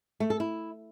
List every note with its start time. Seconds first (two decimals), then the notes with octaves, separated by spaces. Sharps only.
0.20 A3
0.30 A4
0.40 E4